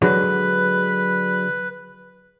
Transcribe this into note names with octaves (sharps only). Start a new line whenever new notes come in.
D3 F#3 G#3 B4